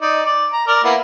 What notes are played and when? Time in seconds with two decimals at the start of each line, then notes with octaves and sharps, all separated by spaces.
0.01 D#4 D5
0.26 D5
0.53 A#5
0.67 A#4 D5
0.84 A#3 B3 E4